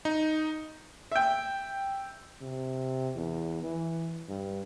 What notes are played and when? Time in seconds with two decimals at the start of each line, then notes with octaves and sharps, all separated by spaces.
0.05 D#4
1.12 E5 G5
2.42 C3
3.15 E2
3.63 E3
4.29 G2